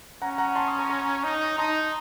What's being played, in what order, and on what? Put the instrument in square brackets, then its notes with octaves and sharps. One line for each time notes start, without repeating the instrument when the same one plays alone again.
[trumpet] C#4 [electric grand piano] F#5 A#5
[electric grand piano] F#5 A#5
A5 C6
C6 D#6
A#5 C#6
A#5 C#6
[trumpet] D#4
[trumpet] D#4 [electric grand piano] A5 C6